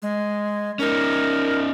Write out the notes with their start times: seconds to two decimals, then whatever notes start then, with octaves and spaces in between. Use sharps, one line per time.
0.02 G#3
0.79 C#4 D#4 A#4